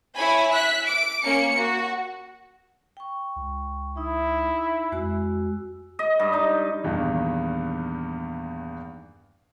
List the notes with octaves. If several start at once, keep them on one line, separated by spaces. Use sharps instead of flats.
E4 C#5 G#5 B5
E5 F#6 B6
D6 D7
A#3 C#4 C#7
F#4
G5 C#6
C#2
D#4 E4
F2 G#3 F#4 E6
D#5
G2
D#4
E2 G2 A#2 D#3